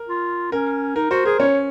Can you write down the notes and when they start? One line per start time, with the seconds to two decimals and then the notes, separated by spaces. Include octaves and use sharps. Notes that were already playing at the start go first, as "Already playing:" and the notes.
Already playing: A#4
0.08 F4
0.52 C#4 A#4
0.96 D#4 A#4
1.11 F#4 C5
1.25 G#4 A#4
1.40 C#4 C#5